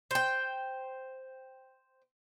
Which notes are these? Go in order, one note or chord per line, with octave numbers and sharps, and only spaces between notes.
C5 G5